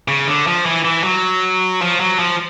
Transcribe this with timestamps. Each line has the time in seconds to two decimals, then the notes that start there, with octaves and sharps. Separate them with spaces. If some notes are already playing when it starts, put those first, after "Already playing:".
0.08 C#3
0.27 D3
0.47 F3
0.66 E3
0.85 E3
1.04 F#3
1.81 F3
2.00 F#3
2.19 F3